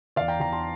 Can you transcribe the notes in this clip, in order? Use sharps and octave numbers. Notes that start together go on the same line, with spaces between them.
E2 D5 F5
G5 A#5
E2 G5 A#5
A5 C6